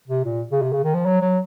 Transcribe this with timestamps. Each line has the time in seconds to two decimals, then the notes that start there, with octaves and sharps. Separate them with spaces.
0.08 C3
0.25 A#2
0.51 C#3
0.62 C3
0.72 C#3
0.84 D#3
0.94 F3
1.05 F#3
1.21 F#3